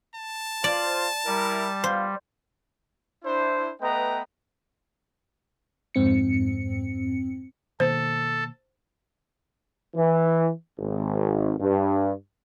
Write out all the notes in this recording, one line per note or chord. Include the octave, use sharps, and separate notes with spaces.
A5
F4 C5 D5
G3 E4 A#4
B3 F4 C5 F5
D4 E4 C5
A3 B3 B4 D#5 G5 A#5
F2 G#2 C4 C#7
B2 D#3 A#3 A4 C5
E3
G#1
G2